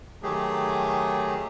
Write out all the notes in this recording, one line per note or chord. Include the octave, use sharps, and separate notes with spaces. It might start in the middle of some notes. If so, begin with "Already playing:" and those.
D#3 F#3 A3 G4 G#4